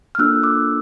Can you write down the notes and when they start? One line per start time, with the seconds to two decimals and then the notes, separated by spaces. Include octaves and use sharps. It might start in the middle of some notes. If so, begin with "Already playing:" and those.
0.15 F6
0.18 A#3 D4 F4 A4 E6 F#6
0.43 D6 E6